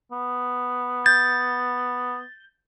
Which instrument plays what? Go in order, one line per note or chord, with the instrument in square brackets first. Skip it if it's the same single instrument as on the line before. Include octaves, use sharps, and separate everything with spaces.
[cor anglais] B3
[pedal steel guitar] G6 [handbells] A6